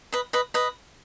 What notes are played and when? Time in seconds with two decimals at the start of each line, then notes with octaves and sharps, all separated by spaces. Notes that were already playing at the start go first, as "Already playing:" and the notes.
0.13 B4 D#5
0.33 B4 D#5
0.54 B4 D#5